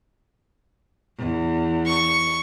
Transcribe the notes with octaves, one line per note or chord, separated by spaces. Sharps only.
E2
C#6